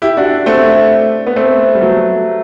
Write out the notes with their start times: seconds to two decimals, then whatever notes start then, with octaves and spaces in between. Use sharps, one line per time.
0.02 E4 G4
0.17 D4 F#4
0.46 A3 C4
1.27 B3
1.36 A3 C4
1.75 G3
1.81 F#3 A3